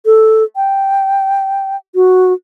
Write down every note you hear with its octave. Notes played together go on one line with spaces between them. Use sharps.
A4
G5
F#4